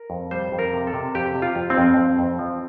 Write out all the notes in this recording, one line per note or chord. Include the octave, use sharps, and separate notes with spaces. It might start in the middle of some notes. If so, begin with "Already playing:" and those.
Already playing: A#4
F2
G3 C5
F2
A#4
C3
A4
C3
F2 G4
C3
F4
F2
C4
F2
F2
F2
F3